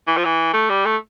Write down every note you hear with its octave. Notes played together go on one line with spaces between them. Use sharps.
E3
F3
E3
A3
G3
A3